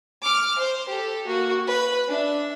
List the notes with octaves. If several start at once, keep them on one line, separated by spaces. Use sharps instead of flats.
D6 F6
C5
G4 A4
A#3 F#4
B4
D4 E5